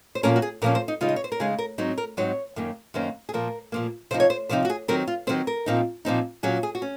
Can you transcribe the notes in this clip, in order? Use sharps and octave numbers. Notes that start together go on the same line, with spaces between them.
C5
A#2 F3 A#3 C#4 A#4
F#4
G#4
A#2 F3 A#3 C#4 A#4
C5
D#4
C#3 G#3 D#4 F4
D#5
C#5
C5
A#4
C#3 G#3 D#4 G#4
A#4
G#2 F#3 C4 D#4
A#4
G#2 F#3 C4 D#4 C#5
F#2 D#3 A#3 C#4
F#2 D#3 A#3 C#4 C5
G#4
A#2 F3 A#3 A#4
A#2 F3 A#3
C3 F3 C4 D#4 C5
C#5
C5
C3 F3 C4 D#4 C5
F#4
G#4
D#3 F#3 C4 A#4
F4
D#3 F#3 C4 C5
A#4
A#2 F3 C4 D#4
A#2 F3 C4 D#4
A#2 F#3 C#4 G#4
G#4
F#4
C#4